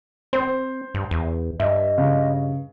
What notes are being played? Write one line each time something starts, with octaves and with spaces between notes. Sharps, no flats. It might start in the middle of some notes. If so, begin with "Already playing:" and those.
C4 C5
G2
E2
G2 D#5 E5
C#3